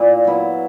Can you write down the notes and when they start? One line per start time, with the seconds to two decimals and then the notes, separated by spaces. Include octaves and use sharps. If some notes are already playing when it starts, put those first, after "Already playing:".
Already playing: A#2 E4
0.24 F#3 B3 E4